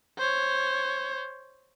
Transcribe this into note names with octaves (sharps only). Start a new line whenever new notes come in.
C5 C#5